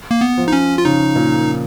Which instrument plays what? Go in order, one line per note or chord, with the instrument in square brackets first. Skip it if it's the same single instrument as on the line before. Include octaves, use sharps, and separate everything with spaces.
[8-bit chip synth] A#3
B3
[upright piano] F3
[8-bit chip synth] D#4
C#4
F4
[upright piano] C#3 [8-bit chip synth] D#4
[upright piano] A#2